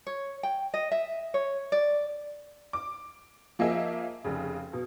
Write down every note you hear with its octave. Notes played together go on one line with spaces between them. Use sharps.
C#5
G5
D#5
E5
C#5
D5
D6
F3 A#3 G#4 D#5 E5
F1 C#3
B2